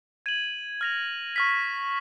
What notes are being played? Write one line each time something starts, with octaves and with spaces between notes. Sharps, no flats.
G#6 D#7 F#7
F6 A#6 F7
C#6 F6 B6